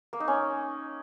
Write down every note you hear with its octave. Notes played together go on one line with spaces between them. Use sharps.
A#3
D#4
C#4